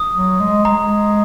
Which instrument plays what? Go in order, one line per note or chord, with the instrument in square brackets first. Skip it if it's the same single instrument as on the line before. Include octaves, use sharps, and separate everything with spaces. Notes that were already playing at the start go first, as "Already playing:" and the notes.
Already playing: [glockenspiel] D#6
[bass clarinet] F#3
G#3
[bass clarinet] G#3 [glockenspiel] A#5